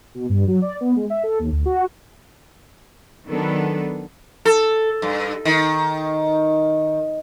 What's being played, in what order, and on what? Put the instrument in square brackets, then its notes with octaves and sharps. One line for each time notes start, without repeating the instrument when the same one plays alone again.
[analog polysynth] B2
G2
F#3
D5
B3
G#3
E5
A4
D#2
D2
F#4
[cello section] D#3 F#3 B3 D4 A4 B4
[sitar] A4
G2
D#3